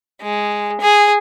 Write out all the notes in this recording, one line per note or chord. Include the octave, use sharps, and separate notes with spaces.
G#3
G#4